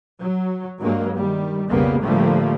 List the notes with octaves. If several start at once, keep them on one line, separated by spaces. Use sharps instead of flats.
F#3
G2 F#3 G#3 A#3
D#3 G3
B1 F2 C#3 G3 A#3 B3
A2 D3 F3 G3 A3 A#3